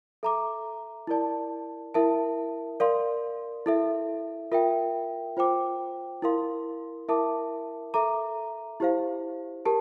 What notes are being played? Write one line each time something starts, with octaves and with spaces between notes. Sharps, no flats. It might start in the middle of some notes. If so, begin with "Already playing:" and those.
A4 E5 A#5 D6
E4 A#4 D5 A5
E4 A#4 E5 A5
A#4 D5 F5 C6
E4 A4 E5
F4 A#4 E5 G5
F4 C5 G5 D6
E4 A#4 F5 C6
E4 A#4 E5 A5 D6
A4 E5 A#5 D6
E4 G4 C5 F5
G4 A#4 A5